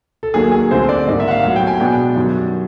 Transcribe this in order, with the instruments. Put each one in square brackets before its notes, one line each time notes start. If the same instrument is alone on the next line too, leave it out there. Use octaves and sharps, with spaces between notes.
[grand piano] A4
D#2 D#3 F#3 A#3 G#4
G#4
D2 D3 G3 C4 C5
D5
G#2 D#3 G3 A#3 D#5
E5
F#5
F5
A2 F#3 B3 F#5
G5
G#5
B2 G#3 B3 D4 G5
F#2 D#3 G3